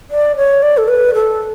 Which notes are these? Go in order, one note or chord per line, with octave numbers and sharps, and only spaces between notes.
D5
C#5
D5
A4
B4
A4